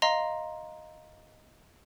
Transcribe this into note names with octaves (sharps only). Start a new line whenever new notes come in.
D#5 F5 A#5 C6